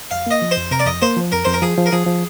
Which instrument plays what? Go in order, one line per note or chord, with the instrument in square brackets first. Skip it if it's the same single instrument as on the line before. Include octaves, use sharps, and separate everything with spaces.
[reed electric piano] F2 [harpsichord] F5
[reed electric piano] A#3 [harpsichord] D#5
[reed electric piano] F3
[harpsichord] C5
[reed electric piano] F2
[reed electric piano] C3 [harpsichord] A#4
[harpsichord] D5
[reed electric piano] F2 [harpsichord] D#5
[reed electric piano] A#3 [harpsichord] C5
[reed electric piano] F3
[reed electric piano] F2 [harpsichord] A#4
[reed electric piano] F2 [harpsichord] C5
[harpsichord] A#4
[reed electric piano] F3 [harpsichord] G#4
[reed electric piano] F3
[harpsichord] A#4
[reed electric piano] F3 [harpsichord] G#4
[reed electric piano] F3